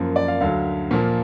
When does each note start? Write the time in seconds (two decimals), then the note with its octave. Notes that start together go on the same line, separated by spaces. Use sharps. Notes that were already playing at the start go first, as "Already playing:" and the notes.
Already playing: F#2 F3 A#3
0.16 D5
0.28 F5
0.41 D2 D3 F#3 F5
0.91 A#2 F3 A#3